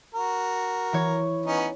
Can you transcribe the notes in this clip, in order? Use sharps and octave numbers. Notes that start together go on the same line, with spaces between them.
F#4 A#4
E3 C#5
B3 C#4 D#4